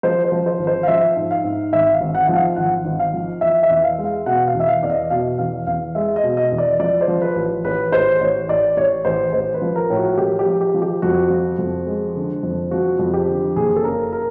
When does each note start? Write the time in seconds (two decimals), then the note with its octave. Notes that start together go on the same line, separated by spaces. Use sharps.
0.03 F3 C5
0.24 C5
0.32 F3
0.46 C5
0.59 G#1
0.67 C5
0.83 F5
0.88 F3 E5
1.16 G#2
1.31 F5
1.44 G#2
1.72 G#1 E5
1.94 F5
2.01 G#1
2.15 F#5
2.27 F3 F#5
2.35 F5
2.56 G#1 F#5
2.85 G#1
2.99 F5
3.14 F3
3.41 E2 E5
3.63 E5
3.70 E2
3.84 F5
3.98 G#3
4.05 F5
4.26 B2 F#5
4.48 F5
4.54 E2
4.60 E5
4.68 F5
4.83 E2 D5
4.90 D#5
5.10 B2 F5
5.38 E2 F5
5.66 E2 F5
5.95 G#3 E5
6.16 D#5
6.24 B2
6.37 D#5
6.51 E2
6.58 D5
6.80 F3 D5
7.01 C5
7.08 F3
7.22 B4
7.36 A1
7.64 A1 B4
7.92 A1 C5
8.20 A1 C#5
8.48 A1 D5
8.77 A1 C#5
9.05 A1 C5
9.33 A1 C5
9.54 B4
9.62 F3
9.76 A#4
9.90 A2
9.97 F#4
10.18 F3 G4
10.39 G4
10.46 F3
10.61 G4
10.74 F3
10.82 G4
11.02 F2 F#4
11.30 F3
11.59 F2
11.87 G#3
12.15 D3
12.43 F2
12.71 F3 F#4
12.99 F2
13.14 G4
13.27 D3
13.56 F#1 G#4
13.76 A4
13.84 C#3 A#4
14.13 A#4